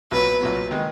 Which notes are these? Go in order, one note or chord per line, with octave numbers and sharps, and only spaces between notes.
B1 A#2 F#3 B4
B1 A#2 F#3
D#3 G#3